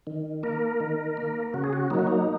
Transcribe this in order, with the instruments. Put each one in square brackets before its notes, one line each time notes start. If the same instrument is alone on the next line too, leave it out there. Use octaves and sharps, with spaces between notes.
[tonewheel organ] D#3
A#3 A#4
D#3
A#3
C#3 F#4
G#4
F#4
F#3 A#3 D#4
F#4
D#4